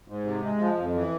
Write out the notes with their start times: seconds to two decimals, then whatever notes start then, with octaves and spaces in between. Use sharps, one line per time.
0.08 G#2
0.25 C3
0.43 G#3
0.59 F3
0.78 F2
0.94 E3